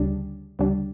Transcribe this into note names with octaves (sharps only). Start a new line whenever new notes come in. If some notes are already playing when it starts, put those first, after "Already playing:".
Already playing: D2 C#3 G3 D4
D2 C#3 G3 D4